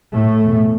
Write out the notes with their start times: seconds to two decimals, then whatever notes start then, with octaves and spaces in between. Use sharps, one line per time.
0.13 A2 A3
0.42 E2 B2